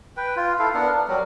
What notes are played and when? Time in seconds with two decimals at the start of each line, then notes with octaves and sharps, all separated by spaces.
0.17 B4 G5
0.36 F4
0.59 E4 A4 F5
0.74 B3 D4 A#4 F#5
0.89 D4
1.08 F#3 G3 A#4